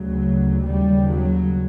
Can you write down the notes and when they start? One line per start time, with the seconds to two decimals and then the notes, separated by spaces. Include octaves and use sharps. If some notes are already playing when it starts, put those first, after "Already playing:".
Already playing: D2 C#3 F#3
0.65 D#2 C#3 G3
1.09 F#3